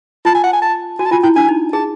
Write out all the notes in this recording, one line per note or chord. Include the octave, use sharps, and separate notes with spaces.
F4 A5
G#5
F#5
G#5
A5
F#4 G#5
A5
F4 G#5
E4 G5
D4 G#5
D#4
G#4 A5